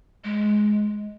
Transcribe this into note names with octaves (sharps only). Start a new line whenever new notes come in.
G#3